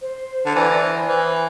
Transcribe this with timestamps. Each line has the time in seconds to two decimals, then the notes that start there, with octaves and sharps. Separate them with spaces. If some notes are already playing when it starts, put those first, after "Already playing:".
0.02 C5
0.46 D3 C5
0.55 E3 D5
0.82 C5
1.09 E3 C5